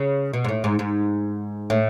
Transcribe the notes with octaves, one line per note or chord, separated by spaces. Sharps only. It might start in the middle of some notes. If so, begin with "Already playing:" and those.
Already playing: C#3
B2
G#2
A2
G#2
G#2
A2